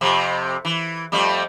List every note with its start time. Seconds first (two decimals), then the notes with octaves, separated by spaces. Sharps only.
0.01 F2 C3
0.65 E3
1.12 F2 G3 A3